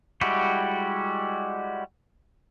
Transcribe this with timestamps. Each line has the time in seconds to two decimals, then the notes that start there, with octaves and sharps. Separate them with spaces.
0.21 G3 G#3 E4 F#4 G4